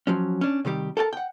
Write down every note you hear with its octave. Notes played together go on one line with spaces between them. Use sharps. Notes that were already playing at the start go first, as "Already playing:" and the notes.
F3 F#3 C#4
C#4 D4
C3 D#3 G3 G4
A4 A#4 G5 A5
F#5 G5